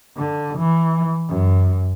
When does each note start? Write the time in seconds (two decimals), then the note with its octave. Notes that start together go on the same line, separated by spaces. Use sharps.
0.17 D3
0.58 E3
1.29 F#2